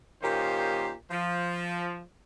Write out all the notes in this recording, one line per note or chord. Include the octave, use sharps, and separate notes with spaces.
A#2 D#3 A#3 C#4 G4 C5
F3